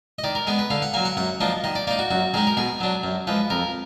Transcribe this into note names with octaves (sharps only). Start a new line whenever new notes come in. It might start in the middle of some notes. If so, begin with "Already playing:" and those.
D#5
D#3 D5
A#4
G#3 B3 G#4
B4
D3 F5
F#5
F#3 A#3 G#5
F#5
F#2 F#5
F3 A#3 D4 D#5
D#3 D#5
D5
A#3 D#4 D5
F#4
F#2 F#4
D#3 G#3 D#4 G#4
A#4
B2 G#4
F#3 D4
F#2
F3 G#3 B4
F2 A#4